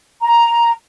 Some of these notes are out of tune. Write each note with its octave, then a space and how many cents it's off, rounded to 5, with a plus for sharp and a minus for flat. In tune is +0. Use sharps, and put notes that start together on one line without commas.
A#5 +5